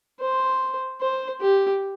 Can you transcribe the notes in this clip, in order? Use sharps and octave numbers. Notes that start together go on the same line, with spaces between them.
C5
C5
G4